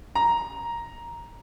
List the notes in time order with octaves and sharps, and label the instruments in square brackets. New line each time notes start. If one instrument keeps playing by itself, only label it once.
[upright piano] A#5